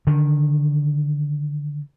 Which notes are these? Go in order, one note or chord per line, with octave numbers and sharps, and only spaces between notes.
D3 D#3